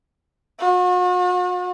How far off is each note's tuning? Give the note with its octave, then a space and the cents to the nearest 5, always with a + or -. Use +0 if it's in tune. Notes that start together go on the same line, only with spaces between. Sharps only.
F#4 -40